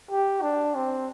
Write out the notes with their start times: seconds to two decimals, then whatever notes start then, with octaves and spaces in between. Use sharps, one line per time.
0.11 G4
0.42 D4
0.75 C4